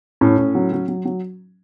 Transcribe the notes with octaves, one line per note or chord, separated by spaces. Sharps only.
A2 C#4
A2
F#3
F#3
F#3
F#3